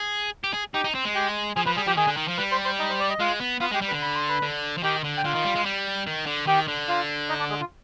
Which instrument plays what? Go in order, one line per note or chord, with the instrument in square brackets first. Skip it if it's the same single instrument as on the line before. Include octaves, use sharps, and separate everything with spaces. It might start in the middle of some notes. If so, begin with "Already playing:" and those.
Already playing: [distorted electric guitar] G#4
G4
G#4
[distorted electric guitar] D#4 [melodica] G4 G5
[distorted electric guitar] D#4
C4
G#3
[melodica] G4 G5
[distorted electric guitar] F3 [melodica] G#4 G#5
[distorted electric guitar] F3 [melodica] B4 B5
[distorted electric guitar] G3 [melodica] G#4 G#5
[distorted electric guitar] F3 [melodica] G4 G5
[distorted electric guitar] D#3 [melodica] G#4 G#5
[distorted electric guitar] D3
D#3
F3
[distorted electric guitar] G3 [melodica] B4 B5
[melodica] C5 C6
C5 C6
D#4 D#5
C5
D5
D#5
[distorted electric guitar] G#3 [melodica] F4 F5
[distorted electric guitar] B3
[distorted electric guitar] B3 [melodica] F4 F5
[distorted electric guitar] G#3 [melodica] G4 G5
[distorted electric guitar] G3
[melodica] B4 B5
[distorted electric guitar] D3
[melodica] B5
C6
B4 B5
[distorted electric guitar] D3
F3
[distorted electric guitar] D#3 [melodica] G4 G5
[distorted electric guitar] D3
[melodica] G5
[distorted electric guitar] D3 [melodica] F4 F5
[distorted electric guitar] D#3
G3
G#3
G3
D#3
D3
[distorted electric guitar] D#3 [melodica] G4 G5
[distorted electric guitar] D3
[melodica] F4 F5
D#4 D#5
D4 D5
G#3 G#4
F4